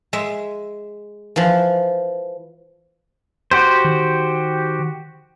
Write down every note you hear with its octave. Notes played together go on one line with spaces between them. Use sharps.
G#3 E5
E3 F3
F#4 G4 C5
D#3